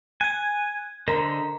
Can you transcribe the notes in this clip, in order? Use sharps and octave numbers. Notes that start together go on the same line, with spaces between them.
G#5 F#6 G#6
D3 A#4 C5 D#5 A#5